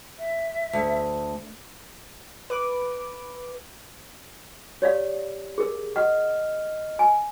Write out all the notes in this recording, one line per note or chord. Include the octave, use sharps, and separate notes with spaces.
E5
D2
B4 D6
G4 C#5 D5 F5
G#4 A#4
D#5 F#5 F6
G#5